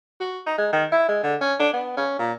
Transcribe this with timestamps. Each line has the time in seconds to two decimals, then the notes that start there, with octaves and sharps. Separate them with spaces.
0.21 F#4
0.47 D#4
0.58 G#3
0.72 D#3
0.92 E4
1.08 G#3
1.23 D3
1.41 C#4
1.60 D4
1.73 B3
1.97 C#4
2.19 A#2